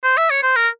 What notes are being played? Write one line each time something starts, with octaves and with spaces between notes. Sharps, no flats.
C5
E5
C#5
C5
A#4